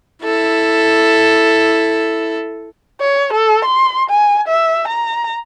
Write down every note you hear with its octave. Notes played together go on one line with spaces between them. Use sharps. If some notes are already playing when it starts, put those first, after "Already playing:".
E4 A4
C#5
A4
C6
G#5
E5
A#5